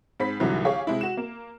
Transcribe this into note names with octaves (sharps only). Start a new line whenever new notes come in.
G#2 C4 B5 B6
C2 G#2 D3 E3 F#3 G3
G4 G#4 C#5 F5
C3 G#3 E4
F#4 E7
A#3